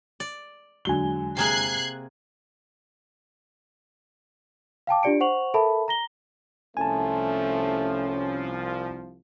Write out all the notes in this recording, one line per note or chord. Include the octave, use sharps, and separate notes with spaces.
D5
E2 D3 F#3 G#3 G#5 G7
C3 A#3 G#4 F#6 G#6 C7
F5 G5 A5 D6
D4 F4 G4 D5 C#7 D7
C5 F#5 C#6 F7 F#7
A4 A#4 E5 A5 B5
A#5 A#6 G7
C2 F3 A3 C#4 G#5 A5